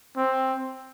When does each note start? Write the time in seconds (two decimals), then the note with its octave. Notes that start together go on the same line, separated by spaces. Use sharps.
0.17 C4